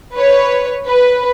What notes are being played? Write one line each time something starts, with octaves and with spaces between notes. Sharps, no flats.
B4 C#5
B4